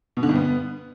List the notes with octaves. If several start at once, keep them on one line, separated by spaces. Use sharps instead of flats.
B2
D3
G2
B3